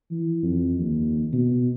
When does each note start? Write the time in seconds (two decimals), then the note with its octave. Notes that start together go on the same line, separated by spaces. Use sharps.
0.11 E3
0.43 F2
0.79 D#2
1.33 B2